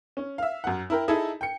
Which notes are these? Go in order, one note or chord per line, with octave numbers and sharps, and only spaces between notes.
C#4
E5 F5
F#2 F#5
E4 A#4 G5
D#4 E4 G#4 A4
G5 C#7